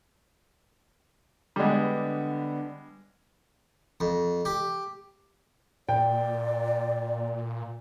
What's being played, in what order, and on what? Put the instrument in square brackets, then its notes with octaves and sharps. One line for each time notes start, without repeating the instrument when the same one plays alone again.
[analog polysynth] D3 B3 [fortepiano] G3 G#3
[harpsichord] F2
G4
[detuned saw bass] A#2 [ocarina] D5 [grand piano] G5